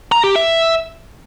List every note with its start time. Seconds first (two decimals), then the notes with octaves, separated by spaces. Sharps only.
0.12 A#5
0.24 G4
0.36 E5